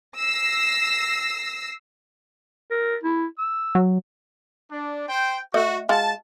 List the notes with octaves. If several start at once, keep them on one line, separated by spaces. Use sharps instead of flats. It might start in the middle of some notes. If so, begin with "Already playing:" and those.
E6 A#6 C7
A#4
E4
E6
F#3
D4
C5 G5
A3 F#4 D#5
G#3 F4 F#4 A5